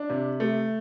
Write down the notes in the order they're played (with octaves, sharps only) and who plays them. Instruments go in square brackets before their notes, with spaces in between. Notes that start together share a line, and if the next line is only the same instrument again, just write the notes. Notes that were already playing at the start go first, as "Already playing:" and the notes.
Already playing: [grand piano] D4
C3
A3